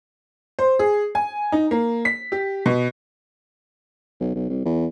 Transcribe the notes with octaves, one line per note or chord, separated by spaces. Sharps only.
C5
G#4
G#5
D#4
A#3
B6
G4
B2
B1
B1
C2
E2